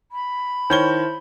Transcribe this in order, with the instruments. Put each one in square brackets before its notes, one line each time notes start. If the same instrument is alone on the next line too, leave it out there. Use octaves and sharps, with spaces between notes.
[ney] B5
[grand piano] D#3 C#5 G7 [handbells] E4 C5 A5